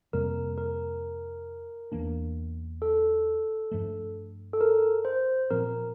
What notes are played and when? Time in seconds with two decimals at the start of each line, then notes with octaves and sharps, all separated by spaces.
0.13 F2 C3 G3 A#3 A#4
0.58 A#4
1.92 E2 E3 A#3 D4
2.82 A4
3.71 G2 F3 A3
4.53 A4
4.61 A#4
5.05 C5
5.50 A#2 F3 C4 A#4